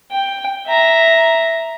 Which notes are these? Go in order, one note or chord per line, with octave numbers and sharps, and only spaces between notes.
G5
E5 A#5